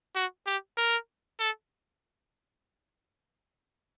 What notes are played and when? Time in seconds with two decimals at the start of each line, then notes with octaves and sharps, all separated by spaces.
0.16 F#4
0.46 G4
0.77 A#4
1.40 A4